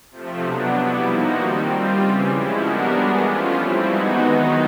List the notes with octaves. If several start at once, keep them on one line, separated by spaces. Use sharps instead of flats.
C3 F3 A3
B2 F#3 B3 D4
G3 B3 E4
F3 A#3 D#4 F#4
D#3 G3 C4
G3 C4 F4
C#3 E3 G3
F3 G#3 C#4 E4
G3 B3 D4 F#4 A#4
E3 G#3 B3 D4
F3 A3 C#4 F4
G3 C4 E4
E3 G#3 B3 D#4 F#4
D#3 F#3 B3 D#4